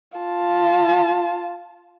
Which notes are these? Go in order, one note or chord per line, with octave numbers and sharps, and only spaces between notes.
F4 A5